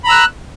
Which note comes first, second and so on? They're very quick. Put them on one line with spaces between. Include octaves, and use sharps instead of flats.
B5 A#5 E6 F#6